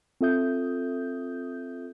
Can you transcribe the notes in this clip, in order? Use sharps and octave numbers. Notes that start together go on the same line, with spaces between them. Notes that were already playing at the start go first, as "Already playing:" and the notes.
C4 F4 A4 E5 D#6 G6